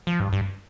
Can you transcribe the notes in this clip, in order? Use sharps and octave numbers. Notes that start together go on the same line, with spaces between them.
F3
G2
G2